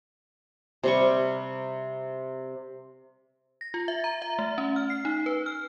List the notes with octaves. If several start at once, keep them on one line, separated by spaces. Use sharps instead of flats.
C3 G3 C#6
A#6
F4
E5
A#5
E5
A3
C#4
F6
C7
D#4
B4
F6